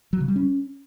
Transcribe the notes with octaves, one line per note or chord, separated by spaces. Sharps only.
F#3
C#3
G3
C#4